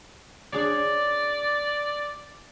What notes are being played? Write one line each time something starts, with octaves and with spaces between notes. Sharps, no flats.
D4 G#4 C#5 D5